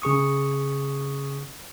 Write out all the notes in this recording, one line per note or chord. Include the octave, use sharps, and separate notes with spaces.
C#3 G#4 C#6 D#6